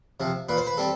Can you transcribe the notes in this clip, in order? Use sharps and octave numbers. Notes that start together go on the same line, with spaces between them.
C3 F3
A#2 B4
C5
B4
G3 C4 A4